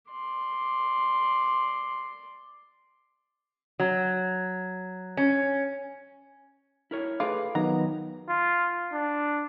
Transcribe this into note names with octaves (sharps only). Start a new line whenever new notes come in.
D5 C6
F#3
C#4
E4 A#4 C#5
A3 F4 G#4 B4 D6
D#3 F#3 B3 D#4 A#5
F4
D4